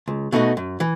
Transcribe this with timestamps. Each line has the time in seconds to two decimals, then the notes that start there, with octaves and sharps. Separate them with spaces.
0.08 C#2
0.32 B2 A3 D#4 F#4
0.57 F#2
0.80 E3